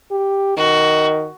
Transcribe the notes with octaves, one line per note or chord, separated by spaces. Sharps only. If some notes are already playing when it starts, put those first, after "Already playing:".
G4
D#3 F#4